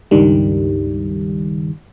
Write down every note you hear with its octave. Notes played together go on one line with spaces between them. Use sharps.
C#2 G2 D#3 G3